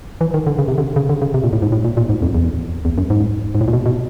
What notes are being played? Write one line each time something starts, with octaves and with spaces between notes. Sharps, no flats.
E3
D#3
D3
C#3
C3
D3
C#3
D3
C#3
C3
A#2
A2
G#2
A2
A#2
A#2
G#2
F2
E2
E2
F#2
G#2
G#2
A2
A#2
B2
B2